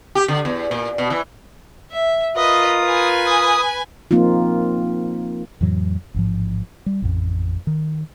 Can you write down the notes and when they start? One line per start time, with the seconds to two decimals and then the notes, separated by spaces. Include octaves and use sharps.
0.15 G4
0.28 D3
0.45 E2
0.71 A#2
0.98 B2
1.10 E3
1.91 E5
2.36 F4 A#4 B4 D#5 D#6
2.84 B4 G#5
3.26 D#6
4.11 F3 A#3 C4 D#4 F4
5.61 F2 A2 E3 F#3
6.14 A1 G#2 F3
6.86 G3
7.02 A1 F2
7.67 D#3